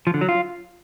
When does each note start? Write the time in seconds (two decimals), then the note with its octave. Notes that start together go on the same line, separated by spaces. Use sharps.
0.07 F3
0.14 D3
0.21 F#3
0.29 F4